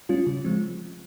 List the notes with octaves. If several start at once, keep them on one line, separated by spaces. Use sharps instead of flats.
G3 C#4 F4
C#3
F3 G#3 C4